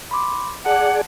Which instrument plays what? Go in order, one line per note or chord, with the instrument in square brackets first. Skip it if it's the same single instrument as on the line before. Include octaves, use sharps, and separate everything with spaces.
[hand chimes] B5 C6 D6
[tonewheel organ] G#4 D5 [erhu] F#5 [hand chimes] A5